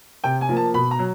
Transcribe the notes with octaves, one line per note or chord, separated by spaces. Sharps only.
C3 G5
G#5
F3 A#3
A5
B2 B5
A#5
F#3